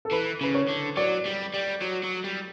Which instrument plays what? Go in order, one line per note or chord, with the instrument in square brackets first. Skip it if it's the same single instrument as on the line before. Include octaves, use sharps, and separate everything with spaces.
[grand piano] A4
[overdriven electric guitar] E3 [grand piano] B4
[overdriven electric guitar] C#3 [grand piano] B4
[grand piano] C#5
[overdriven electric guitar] D3
[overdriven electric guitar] F#3 [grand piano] D5
[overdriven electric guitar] G3
G3
F#3
F#3
G3